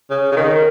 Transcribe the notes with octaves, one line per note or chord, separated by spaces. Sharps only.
C#3
C#3
D#3